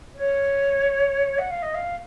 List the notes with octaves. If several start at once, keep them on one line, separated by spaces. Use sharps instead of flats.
C#5
F#5
F5
D#5
F5